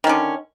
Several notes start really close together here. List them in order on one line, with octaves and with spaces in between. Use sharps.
D#3 C#4 D3